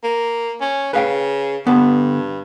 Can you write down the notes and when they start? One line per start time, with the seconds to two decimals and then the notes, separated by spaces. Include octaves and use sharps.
0.04 A#3
0.61 C#4
0.93 C#3 B4 F5 G5
1.67 G2 D3 B3